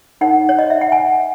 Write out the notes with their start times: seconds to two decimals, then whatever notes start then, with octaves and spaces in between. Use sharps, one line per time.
0.21 D#4 A#4 C#5 F#5
0.49 C#5
0.59 D#5
0.70 E5
0.81 F#5
0.92 G#5